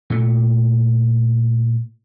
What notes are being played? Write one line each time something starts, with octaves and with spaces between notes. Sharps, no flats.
A#2 A3